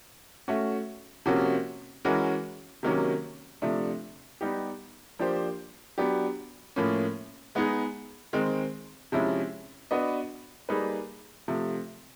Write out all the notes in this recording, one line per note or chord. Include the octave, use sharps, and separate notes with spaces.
A3 C#4 F#4
C3 F3 A#3 C#4 F#4
E3 G#3 C#4 F#4 A#4
C3 D#3 F#3 A#3 C#4
C3 F3 A3 D4
G3 B3 D#4 G4
F3 A#3 D4 G4 C5
F#3 B3 D4 G4
A2 F3 A#3 C#4
G#3 B3 D#4 G#4
D#3 G#3 C4
C3 F3 G#3 C#4 E4
B3 D4 F#4 B4 D#5
G3 A#3 D#4 G#4 B4
C3 F3 A3